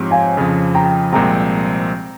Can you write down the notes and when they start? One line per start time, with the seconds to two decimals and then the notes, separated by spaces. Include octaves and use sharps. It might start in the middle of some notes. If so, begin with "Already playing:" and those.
Already playing: G#2 F3 C4 G4 C#5
0.11 F5 G#5
0.37 F2 C#3 F3
0.75 G5 A#5
1.12 C2 A#2 F3 G#3 C4 G5 A#5